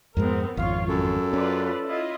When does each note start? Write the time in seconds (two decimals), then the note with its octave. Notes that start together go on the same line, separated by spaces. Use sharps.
0.17 F2 G#2 G#3 B3 C4 A#4
0.57 G#1 F2 F4 C#5 F5
0.87 F#2 A4
1.33 C#4 F4 B4 D5
1.85 E4 F4 D#5